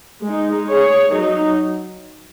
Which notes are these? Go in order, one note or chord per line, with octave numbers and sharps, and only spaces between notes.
G#3 D#4
G#4 C#5
F#3 D#4